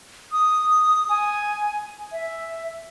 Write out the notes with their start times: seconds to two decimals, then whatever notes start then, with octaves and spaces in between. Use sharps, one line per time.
0.32 D#6
1.09 G#5
2.12 E5